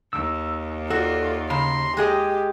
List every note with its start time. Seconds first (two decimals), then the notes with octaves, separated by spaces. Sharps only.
0.13 D#2 E6
0.90 F4 F#4 A4 D5
1.50 C#3 A#5 C6
1.97 G#3 G4 G#4 D#5